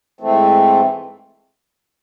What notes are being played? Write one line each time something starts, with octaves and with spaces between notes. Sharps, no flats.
G#2 E3 A3 C4